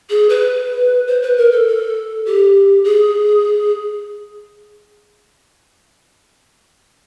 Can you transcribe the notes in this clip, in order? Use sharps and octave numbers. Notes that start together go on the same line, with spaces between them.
G#4
B4
C5
B4
A#4
A4
A4
G4
G#4